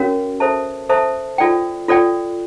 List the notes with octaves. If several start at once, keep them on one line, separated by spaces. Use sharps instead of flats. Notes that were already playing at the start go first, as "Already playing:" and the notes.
Already playing: C#4 F#4 A#4 C#5 F5
A4 C5 E5 A5
A4 C5 E5 A5
F4 A4 D5 G5
F4 A4 D5 G5